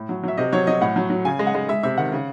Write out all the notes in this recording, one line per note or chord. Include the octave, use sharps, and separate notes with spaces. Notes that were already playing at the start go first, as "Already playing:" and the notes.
Already playing: A2
F#3
F#3 E5
C3 D#5
F#3 C#5
F#3 D#5
A2 F#5
F#3
F#3
C#3 G#5
G#3
F#5
G#3
G#3 E5
C3 E5
D#3 F#5
C#3